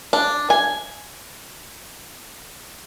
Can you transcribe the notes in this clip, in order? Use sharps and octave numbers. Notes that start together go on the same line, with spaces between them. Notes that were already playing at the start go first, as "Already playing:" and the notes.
D4
G#5